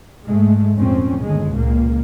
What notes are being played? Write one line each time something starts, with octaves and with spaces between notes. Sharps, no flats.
G#2 G#3 A3
F2 A#2 C4 C#4
G1 D#2 G#3
C#2 A#2 A#3